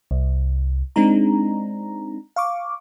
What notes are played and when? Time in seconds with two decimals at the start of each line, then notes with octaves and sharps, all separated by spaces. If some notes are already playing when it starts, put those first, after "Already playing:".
0.11 C2
0.96 G#3 C4 D4 D#4 A#5
2.36 F5 C#6 D6